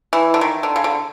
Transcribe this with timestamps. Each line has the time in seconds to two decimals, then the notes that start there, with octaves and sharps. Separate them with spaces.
0.13 E3
0.34 D3
0.41 D#3
0.63 D3
0.76 C#3
0.84 D3